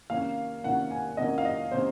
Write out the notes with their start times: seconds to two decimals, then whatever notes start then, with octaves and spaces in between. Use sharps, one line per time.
0.10 C3 D#3 A#3 C#4 F5
0.63 C3 D#3 A#3 C#4 F#5
0.91 G#5
1.17 C3 D#3 A#3 C#4 D#5
1.38 F5
1.45 D#5
1.72 C3 D#3 A#3 C#4 C5